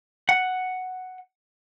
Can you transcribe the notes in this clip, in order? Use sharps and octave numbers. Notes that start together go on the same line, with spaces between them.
F#5